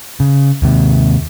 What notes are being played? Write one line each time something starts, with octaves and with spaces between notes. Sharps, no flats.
C#3
D#2 C3